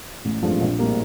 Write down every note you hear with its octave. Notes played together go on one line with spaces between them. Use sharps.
A1
G2 F3 A3 C4
A#1
A2 G3 A#3